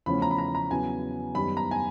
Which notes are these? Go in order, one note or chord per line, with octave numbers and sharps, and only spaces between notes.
E2 C#3 F3 A3 C#4 B5
A#5
B5
A#5
A#5
E2 C#3 F#3 B3 G#5
F#2 D#3 G3 B3 B5
A#5
G#5